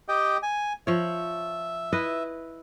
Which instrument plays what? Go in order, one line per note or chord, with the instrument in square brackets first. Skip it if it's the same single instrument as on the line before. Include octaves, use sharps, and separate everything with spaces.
[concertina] G4 D#5 G5
G#5
[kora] F3 C#5 [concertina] E5
[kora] E4 B4 D#5